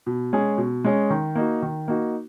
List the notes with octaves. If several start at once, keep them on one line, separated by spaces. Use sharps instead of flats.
B2
G#3 C#4 G#4
B2
G#3 C#4 G#4
D#3
A#3 D#4 F#4
D#3
A#3 D#4 F#4